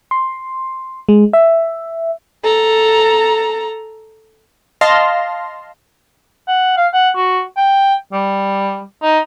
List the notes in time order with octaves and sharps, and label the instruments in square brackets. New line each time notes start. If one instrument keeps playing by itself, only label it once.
[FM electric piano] C6
G#3
E5
[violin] A4 A#5
[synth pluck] D#5 F5 A5 C6 F6 A#6
[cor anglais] F#5
F5
F#5
F#4
G5
G3
D#4